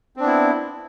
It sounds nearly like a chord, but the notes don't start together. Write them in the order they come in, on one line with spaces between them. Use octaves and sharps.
C4 D4 B3 E4